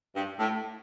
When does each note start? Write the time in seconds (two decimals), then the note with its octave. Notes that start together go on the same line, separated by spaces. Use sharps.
0.16 G2
0.39 A2